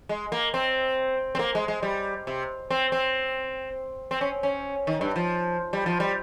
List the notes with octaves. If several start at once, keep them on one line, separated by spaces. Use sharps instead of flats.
G#3
A#3
C4
C4
A#3
G#3
G#3
G3
C3
C4
C4
C4
C#4
C#4
D#3
G2
F3
G3
F3
G3